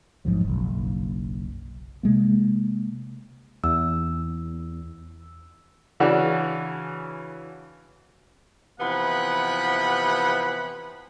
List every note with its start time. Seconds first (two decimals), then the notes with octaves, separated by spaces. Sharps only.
0.25 A#1 G#2 F3 F#3
0.45 F#1 B1
2.03 C3 G#3 A#3
3.64 E2 E6
6.00 C#3 E3 D4 F#4
8.81 C3 E3 F3 B3 F#5 B5